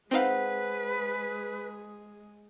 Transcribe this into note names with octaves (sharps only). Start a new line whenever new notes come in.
G#3 C4 D#4 G#4 B4 C5 F5 F#5